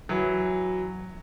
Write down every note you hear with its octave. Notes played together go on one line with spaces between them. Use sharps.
E3 F#3